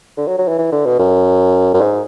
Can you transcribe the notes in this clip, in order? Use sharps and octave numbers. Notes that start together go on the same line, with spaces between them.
D3
F#3
F#3
E3
E3
D3
B2
F#2
F#2
G#2